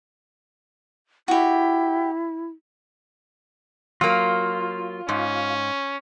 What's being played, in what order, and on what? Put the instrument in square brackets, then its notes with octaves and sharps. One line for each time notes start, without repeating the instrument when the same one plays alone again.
[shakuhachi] E4 [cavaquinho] F#4 G4
[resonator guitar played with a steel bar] F#3 A#3 [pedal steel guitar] F4
[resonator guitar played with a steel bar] G#2 [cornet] C#4